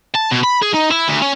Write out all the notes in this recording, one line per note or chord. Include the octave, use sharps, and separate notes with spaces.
A5
B2
B5
G#4
D#4
E4
D2
C#4